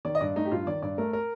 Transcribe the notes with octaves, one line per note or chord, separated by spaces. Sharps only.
D#3 D5
D#5
G2 D5
A3 D#4
G4
G2 F4
D#3 D5
G2 D5
A3 A#4
A#4